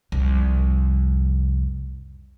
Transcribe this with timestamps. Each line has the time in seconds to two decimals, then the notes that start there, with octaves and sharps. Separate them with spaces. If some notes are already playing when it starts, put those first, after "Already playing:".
0.12 C2 F2